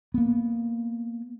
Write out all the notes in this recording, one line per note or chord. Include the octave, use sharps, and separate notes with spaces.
A#3 B3